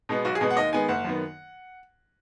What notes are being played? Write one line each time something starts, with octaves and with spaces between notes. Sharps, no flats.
B2 G#3 B3
B1 F#4
G#4
B2 G#3 B3
F#5
D#2 D#5
D#3 G#3 B3 G#5
F#1 F#5
F#2 D#3 B3